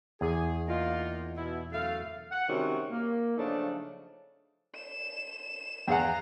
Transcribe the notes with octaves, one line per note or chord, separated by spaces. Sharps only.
E2 G#4
A#3 D#4 F4
B2 E4
F#2 A3 F5
F#5
C3 D#3 G3 G#3 C#4 F#4
A#3
C#3 F3 F#3 A3 D4 D#4
E7
E2 G#4 F5 F#5 A#5